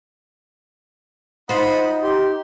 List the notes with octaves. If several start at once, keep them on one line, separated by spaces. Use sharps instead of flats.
D#4 F4 C5 D#5 F#5 B5
G4 C6